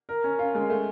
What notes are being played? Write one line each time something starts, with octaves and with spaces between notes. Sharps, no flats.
A#4
C#4
F4
G#3
A3